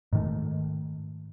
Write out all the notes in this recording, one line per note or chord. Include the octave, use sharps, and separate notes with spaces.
G#2 D#3 A3